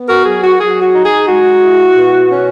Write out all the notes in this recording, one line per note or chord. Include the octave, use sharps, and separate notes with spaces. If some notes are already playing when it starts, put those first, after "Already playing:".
Already playing: B3
F#4 A#4
F#3 G#4
F#4
F#3 G#4
F#4
D#4
G#4
G#3 F#4
E4
B2
C#4